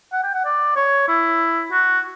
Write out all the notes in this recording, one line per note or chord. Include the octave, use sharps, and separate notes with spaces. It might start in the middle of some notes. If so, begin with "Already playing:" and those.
F#5
G5
F#5
D5
C#5
E4
F#4